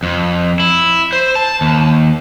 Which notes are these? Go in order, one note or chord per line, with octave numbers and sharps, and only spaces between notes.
F2
E4
C5
A5
D#2